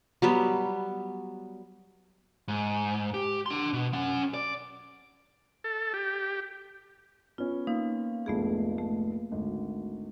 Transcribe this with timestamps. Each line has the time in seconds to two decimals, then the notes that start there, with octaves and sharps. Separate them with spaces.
0.22 F#3 G3 B3
2.48 G#2
3.14 G4
3.46 D4 C6
3.73 B2
3.93 C#4 F#5
4.34 D5
5.64 A4
5.94 G4
7.38 B3 C#4 F4
7.67 A#3 D#4
8.26 F1 A#1 G#2 A3 B3 G#4
8.78 A3
9.31 G#1 D2